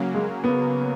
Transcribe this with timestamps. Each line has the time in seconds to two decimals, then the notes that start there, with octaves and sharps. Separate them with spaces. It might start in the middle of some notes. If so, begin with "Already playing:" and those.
Already playing: C#3 F#3 A#3
0.15 G#3
0.44 B3